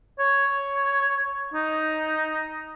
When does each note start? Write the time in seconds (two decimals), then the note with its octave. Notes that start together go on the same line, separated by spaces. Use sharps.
0.20 C#5
1.54 D#4